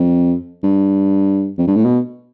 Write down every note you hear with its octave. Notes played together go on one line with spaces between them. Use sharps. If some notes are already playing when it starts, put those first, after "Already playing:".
Already playing: F2
G2
F2
G2
A2
B2